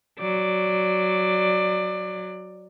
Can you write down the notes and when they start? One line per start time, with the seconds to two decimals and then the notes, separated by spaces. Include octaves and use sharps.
0.18 F#3 D5